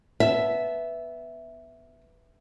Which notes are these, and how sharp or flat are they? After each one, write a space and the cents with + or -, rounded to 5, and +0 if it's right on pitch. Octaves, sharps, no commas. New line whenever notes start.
B3 +0 E5 +0 A5 -15